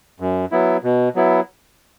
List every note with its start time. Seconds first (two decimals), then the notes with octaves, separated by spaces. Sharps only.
0.20 F#2
0.52 F#3 B3 E4
0.83 B2
1.15 F#3 B3 E4